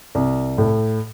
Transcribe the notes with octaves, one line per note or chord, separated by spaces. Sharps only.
C2
A2